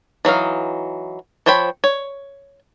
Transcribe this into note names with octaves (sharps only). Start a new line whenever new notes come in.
E3 F#3 D#4 F5
F3 C5 C#5 G5 B5
C#5